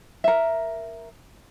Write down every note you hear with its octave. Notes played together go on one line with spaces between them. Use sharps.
A#4 E5